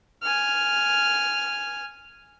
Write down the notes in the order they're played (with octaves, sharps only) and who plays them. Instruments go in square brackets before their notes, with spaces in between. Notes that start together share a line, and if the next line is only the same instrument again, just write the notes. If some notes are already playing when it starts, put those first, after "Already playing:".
[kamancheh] G#5 F6